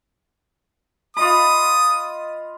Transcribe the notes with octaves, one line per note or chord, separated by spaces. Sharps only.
F4 D#5 B5 D#6